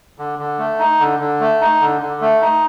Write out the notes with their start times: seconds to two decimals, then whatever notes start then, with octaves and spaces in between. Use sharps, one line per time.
0.18 D3
0.39 D3
0.59 A3
0.79 D#4
1.00 D3
1.20 D3
1.40 A3
1.61 D#4
1.81 D3
2.01 D3
2.21 A3
2.42 D#4